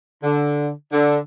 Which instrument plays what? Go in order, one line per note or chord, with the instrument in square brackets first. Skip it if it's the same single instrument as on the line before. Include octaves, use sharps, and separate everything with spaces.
[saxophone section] D3
D3